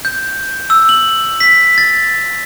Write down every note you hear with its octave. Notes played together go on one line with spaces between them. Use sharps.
G6
E6
F#7
B6
A6